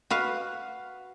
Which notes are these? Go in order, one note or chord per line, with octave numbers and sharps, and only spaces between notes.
F#4 B4 F5